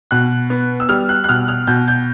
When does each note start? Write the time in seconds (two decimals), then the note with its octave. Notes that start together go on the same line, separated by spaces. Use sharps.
0.11 B2 F#6
0.50 B3
0.80 E6
0.89 G3 F6
1.09 F#6
1.24 F#6
1.29 B2 F6
1.48 F6
1.67 B2 G6
1.88 G6